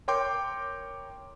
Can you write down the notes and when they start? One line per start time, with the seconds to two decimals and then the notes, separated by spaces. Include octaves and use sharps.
0.08 A#4 C#5 G5 C6 D6 G6